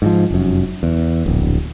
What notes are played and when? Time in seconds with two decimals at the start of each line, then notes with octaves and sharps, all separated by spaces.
0.02 G#2 E3 F3
0.30 F1 F#2
0.83 E2
1.26 D1 A#1